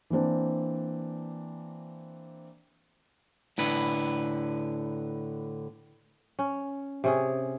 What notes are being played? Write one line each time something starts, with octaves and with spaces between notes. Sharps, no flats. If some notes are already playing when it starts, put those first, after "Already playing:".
E3 A#3 C4 D4
A2 D3 B4
C#4
C3 C#4 G#4